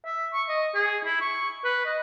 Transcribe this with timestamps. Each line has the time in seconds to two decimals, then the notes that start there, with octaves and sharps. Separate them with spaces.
0.05 E5
0.33 C#6
0.49 D#5
0.75 G#4
1.05 E4
1.21 C#6
1.64 B4
1.85 D#5